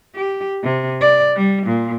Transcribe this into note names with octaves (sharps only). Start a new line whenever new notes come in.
G4
C3
D5
G3
A#2